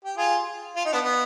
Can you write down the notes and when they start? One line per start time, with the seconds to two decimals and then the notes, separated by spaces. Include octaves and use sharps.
0.05 G4
0.17 F4 G#4
0.76 F4
0.85 D#4
0.93 B3 D4
1.04 B3